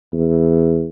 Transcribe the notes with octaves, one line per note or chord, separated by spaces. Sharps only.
E2